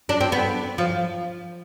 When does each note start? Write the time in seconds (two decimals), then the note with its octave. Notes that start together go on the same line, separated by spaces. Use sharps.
0.09 D4
0.21 C4
0.32 B3
0.78 F3